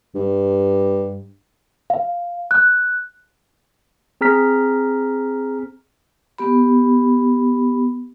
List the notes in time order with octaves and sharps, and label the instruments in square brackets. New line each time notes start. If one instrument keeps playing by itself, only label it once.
[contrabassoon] G2
[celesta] F5
F#6
[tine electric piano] C4 G#4 A#5 F6 B6
[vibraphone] B3 G4 B5